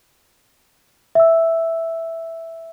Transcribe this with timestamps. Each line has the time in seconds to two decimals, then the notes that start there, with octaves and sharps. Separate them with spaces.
1.15 E5 E6